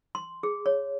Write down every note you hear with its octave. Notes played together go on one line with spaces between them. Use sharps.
C6
G#4
C#5